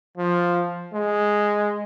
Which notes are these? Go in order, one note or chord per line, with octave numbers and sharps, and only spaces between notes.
F3
G#3